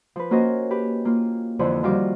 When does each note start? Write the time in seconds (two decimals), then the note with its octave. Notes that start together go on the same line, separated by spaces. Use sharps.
0.16 F3 B4
0.31 A#3 C#4 F#4 A#4 C5 D#5
0.71 G4 B4
1.05 A#3 F4
1.59 F2 D3 E3 F3
1.83 D#3 F3 G3 F4 F#4 D6